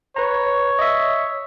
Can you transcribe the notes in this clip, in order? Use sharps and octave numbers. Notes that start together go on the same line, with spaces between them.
B4 C#5 A#5
D#5 E5